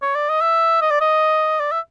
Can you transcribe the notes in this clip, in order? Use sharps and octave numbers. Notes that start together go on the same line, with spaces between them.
C#5
D5
D#5
E5
D#5
D5
D#5
D5
E5